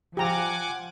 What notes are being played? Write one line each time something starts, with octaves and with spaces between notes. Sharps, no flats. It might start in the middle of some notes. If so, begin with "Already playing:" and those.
F3 G4 F#5 G#5 A#5 D6